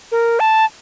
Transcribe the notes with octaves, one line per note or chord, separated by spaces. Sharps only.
A#4
A5